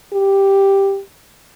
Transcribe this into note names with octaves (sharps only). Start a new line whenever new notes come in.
G4